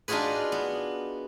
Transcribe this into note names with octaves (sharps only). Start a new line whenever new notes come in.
D4 D#4 F4 F#4 G#4 B4
B3